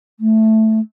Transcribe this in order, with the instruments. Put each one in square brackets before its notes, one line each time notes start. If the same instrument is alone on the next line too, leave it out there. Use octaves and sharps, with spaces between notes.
[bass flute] A3